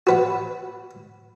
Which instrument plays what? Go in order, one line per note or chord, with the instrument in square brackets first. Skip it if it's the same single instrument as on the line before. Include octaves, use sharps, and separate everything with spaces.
[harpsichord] F#4 B4 F#5